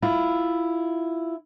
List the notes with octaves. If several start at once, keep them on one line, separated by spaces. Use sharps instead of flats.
E4 F4